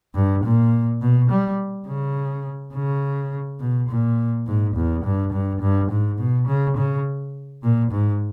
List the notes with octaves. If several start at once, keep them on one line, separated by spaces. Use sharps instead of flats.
G2
A#2
B2
G3
C#3
C#3
B2
A#2
G#2
E2
G2
G2
G2
G#2
B2
C#3
C#3
A#2
G#2